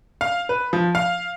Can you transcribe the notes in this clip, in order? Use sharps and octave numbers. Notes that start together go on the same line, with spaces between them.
F5
B4
F3
F5